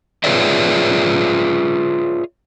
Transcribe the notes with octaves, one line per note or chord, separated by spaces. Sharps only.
F4 G#4 B4 C#5 D5 E5